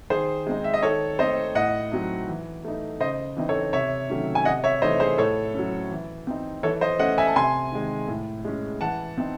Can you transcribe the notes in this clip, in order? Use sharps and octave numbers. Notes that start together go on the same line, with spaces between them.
D#3 G#4 C5
G#3 C4 D#4
E5
D#5
D#3 A4 C#5
A3 C4 D#4 C5 D#5
A2 D#5 F#5
F#3 C4 D#4
E3
A3 D#4
C#3 C5 D#5
E3 C4 D#4
A4 C#5
C3 C#5 E5
D#3 F#3 A3 C#4
G#5
C3 D#5 F#5
C#5 E5
E3 A3 D#4 C5 D#5
G#4 C5
A2 A4 C#5
F#3 C#4
E3
C4 D#4
E3 A4 C#5
C5 D#5
A3 C#4 D#5 F#5
E5 G#5
A5
C3 G#5 C6
D#3 G#3
A2
G#3 C#4
E3 F#5 A5
C4 D#4